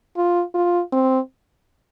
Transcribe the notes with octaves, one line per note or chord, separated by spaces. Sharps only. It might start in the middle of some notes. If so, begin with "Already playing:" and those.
F4
F4
C4